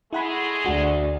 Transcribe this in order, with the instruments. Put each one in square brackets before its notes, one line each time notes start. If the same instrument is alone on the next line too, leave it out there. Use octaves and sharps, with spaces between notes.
[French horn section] G#3 A3 G#4 [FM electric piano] E4 F#5 B5
[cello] D2 [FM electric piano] F#4